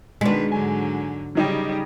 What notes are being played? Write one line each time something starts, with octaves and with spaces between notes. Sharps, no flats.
B2 D#3 G#3 D4 B4 B6
G#2 D3 F#3 G#5
C#3 F#3 G3 D#4 G4